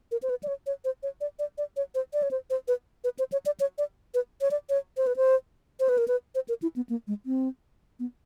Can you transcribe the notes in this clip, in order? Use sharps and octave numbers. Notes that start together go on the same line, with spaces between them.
A#4
C5
B4
D5
C#5
C#5
C5
C#5
D5
D5
D5
C#5
C5
D5
C#5
C5
C5
B4
B4
C5
C#5
D5
C#5
D5
B4
C#5
D5
C#5
C5
B4
C5
C5
B4
A#4
B4
C5
A#4
E4
B3
A#3
G#3
C4
B3